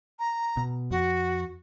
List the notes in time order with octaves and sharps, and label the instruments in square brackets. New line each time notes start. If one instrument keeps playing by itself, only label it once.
[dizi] A#5
[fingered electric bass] B2
[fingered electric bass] F2 [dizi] F#4